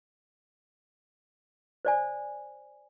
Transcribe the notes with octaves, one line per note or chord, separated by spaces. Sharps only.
C5 D5 G#5